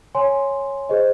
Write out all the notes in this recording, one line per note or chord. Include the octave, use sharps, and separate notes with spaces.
C#5 G#5 C6
G#4 C5 D#5